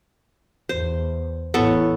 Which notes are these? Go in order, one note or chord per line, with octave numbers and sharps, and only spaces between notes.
E2 C5
A1 B3 E4 A4 C#5 C#6